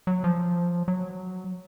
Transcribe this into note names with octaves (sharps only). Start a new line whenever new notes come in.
F#3
F3
F#3